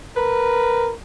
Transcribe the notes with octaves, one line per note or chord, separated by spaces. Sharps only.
A#4 B4